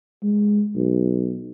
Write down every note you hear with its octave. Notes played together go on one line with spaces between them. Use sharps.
G#3
B1